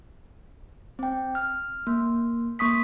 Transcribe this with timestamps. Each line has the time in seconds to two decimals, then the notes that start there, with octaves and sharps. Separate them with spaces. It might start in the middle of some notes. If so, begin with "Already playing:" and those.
0.99 C4 G5
1.35 F6
1.87 A#3
2.59 A#3 C#6 D#6 B6